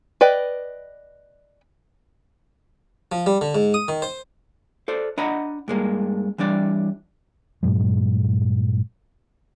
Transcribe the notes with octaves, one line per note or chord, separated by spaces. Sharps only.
B4 D5 D#5 G5
F3
G3
D3
G#2
D#6
D#3
C5
A4 C5 D5
D4 D#5 F#5 A#5 B5
G2 G#3 A#3
E3 G3 D4 D5
G2 A#2 F#3 G#3